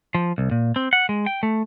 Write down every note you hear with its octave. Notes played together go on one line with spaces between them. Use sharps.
F3
C2
A#2
C4
F#5
G#3
G5
A3